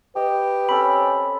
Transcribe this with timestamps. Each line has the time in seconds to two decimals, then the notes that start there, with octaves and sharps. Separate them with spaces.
0.16 G4 B4 D#5
0.69 C4 C#4 A4 B5